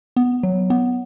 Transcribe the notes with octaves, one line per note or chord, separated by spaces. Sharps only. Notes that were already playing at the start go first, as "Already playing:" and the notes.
B3
F#3
B3